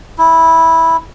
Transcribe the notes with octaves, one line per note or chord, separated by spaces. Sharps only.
E4